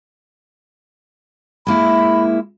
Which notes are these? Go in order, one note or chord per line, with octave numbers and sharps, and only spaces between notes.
G#3 A#3 E4 B5